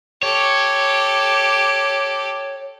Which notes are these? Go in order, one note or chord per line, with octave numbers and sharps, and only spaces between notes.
G4 A4 C#5